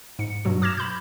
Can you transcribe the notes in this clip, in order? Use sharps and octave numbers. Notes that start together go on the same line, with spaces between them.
G#2 C#7
G2 B2 F#3 F#4
D6 F6 G#6 A#6 E7
B5 G6